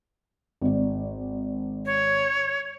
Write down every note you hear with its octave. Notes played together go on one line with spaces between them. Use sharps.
G#1 D5
C#5